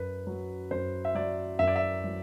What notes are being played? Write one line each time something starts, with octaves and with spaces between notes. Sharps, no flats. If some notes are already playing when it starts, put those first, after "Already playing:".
Already playing: F#2 B4
F#3
F#2 C5
E5
F#3 D5
F#2 E5
D5
E5
F#3